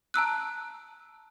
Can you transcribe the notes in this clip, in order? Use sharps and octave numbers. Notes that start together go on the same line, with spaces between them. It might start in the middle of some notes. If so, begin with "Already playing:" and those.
A5 A#5 E6 F#6